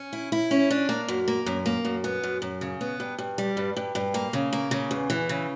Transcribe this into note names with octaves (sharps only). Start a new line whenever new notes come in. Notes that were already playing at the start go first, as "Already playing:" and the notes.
Already playing: C#4
E4
E4
C#4
D4
A#3
F#2
A#3
F#2
A#3
F#2
B3
F#2
F#2
C#3
B3
G2
G2
G3
G2
G2
G2
A#3
C#3
A#3
C#3
E2
E3
C#3